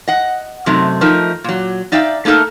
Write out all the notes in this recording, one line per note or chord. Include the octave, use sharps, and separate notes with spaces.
D#5 F#5
F#2 C3 F#3 A3 C4 D#4
F3 A3 D#4 A#4
A#2 F#3
D#4 D5 E5 F5 G5
A3 A#3 D#4 A4 A#4